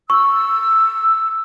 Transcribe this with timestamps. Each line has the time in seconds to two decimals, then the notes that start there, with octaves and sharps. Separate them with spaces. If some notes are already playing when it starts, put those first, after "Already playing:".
0.10 C#6 E6